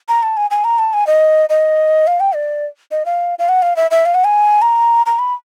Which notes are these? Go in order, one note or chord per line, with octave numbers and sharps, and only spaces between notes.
A#5
A5
G#5
G#5
A#5
A5
G#5
D#5
D#5
F5
G5
D5
D#5
F5
F5
F#5
F5
E5
E5
F5
F#5
G#5
A#5
A#5
B5